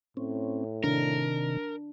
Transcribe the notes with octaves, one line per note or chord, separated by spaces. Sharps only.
A2 C4 C#4
C3 D#3 D4 A#4